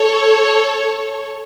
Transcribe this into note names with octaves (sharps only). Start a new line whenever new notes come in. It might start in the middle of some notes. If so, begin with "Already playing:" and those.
Already playing: A4 C#5